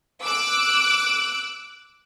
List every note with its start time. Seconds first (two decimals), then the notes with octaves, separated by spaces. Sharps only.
0.24 D6 E6 F#6 D7